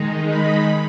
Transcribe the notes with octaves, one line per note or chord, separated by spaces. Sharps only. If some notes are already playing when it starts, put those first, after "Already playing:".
Already playing: D#3 G#3 D#4
B5